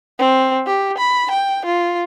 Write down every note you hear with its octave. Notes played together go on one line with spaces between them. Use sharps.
C4
G4
B5
G5
F4